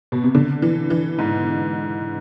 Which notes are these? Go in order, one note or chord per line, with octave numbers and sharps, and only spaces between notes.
B2
C3
D3
E3
E3
G#2